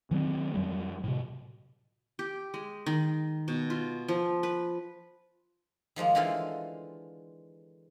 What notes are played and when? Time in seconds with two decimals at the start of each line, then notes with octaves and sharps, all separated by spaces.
0.11 D#3 F#3 A3 C4
0.54 F2 F#3 G3
1.04 A2 C3
2.19 G4
2.54 G#3
2.86 D#3
3.48 B2
3.70 F4
4.08 F3
4.43 B4
5.96 D#3 F3 G#3 A#3
6.15 D3 E3 G#3 F4 A4 F5